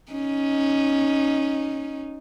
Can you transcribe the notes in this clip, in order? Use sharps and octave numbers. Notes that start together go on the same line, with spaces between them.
C#4 D#4